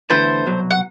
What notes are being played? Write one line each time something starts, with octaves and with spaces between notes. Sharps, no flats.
E2 D3 A3 E4 A4 B4 C5
C2 B2 F#3
F#5